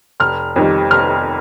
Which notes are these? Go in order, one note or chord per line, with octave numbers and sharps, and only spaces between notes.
F1 F6
F2 D#3 G3
F1 F6